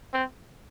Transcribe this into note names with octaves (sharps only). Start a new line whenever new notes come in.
C4